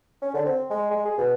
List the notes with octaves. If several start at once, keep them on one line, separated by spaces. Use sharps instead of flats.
C#4
D3
C4
G#3
G#3
G#4
B2